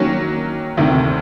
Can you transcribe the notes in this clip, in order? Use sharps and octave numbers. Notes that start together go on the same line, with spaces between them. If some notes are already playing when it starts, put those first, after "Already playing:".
Already playing: D#3 F#3 A#3 C#4
D2 C3 D#3